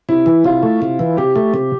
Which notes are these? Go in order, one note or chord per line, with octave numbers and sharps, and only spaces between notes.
C3 E4
E3
C3 F4
A3
C3
E3
C3 G4
A3
C3